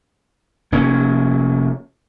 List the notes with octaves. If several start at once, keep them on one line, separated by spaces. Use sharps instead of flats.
F1 A#3 C#4